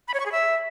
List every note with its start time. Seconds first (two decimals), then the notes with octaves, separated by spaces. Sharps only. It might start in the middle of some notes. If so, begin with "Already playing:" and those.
0.08 B5
0.14 C#5
0.20 C#6
0.26 G#4
0.32 E5